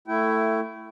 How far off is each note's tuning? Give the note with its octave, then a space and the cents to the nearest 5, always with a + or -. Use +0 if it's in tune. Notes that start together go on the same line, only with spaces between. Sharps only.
A3 +15 E4 +10 G5 -25